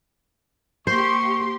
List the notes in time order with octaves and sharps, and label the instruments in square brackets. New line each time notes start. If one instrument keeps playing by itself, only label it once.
[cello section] A#3 G4 [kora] C5 [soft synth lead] C6 [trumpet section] C#6